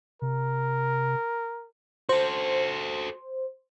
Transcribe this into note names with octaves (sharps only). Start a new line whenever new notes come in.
C3 A#4
F#4 A4 C5